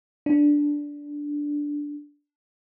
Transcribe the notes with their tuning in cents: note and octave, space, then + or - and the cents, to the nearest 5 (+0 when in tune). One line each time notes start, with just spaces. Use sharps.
D4 -5